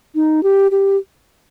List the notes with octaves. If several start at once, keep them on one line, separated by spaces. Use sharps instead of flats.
D#4
G4
G4